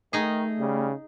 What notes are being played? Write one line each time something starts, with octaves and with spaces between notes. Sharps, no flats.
D#3 A3 D#4 G#4
C#3 G3